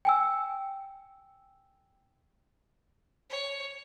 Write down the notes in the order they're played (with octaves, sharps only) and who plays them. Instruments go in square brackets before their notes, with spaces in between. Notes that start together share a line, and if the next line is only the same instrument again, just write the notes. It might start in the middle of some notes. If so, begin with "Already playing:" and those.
[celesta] G5 G#5 E6
[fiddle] C#5